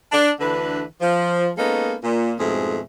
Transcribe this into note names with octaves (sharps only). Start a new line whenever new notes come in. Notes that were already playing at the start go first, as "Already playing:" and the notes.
D4
D2 D3 E3 D4 B4
F3
G#3 A#3 B3 C#4 D#4 A4
A#2
F2 G#2 B2 A3 G#4 C5